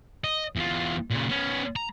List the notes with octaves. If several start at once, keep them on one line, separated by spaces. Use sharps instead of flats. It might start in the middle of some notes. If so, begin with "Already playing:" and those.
D#5
E2 F4
A#2 C#3
B3 C#4
A#5